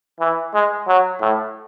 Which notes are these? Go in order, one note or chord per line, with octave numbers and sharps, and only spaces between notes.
E3
G#3
F#3
A2